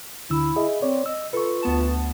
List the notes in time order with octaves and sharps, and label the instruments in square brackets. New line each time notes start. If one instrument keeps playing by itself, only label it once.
[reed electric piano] D2 D3 E6 [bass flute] E4
[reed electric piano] G#4 D#5 E5
[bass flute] C4 [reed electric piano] C#5 D5
[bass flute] D#5 [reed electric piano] E6
[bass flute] F4 [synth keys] A4 [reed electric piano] B4 C#6
[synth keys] D2 B3 A5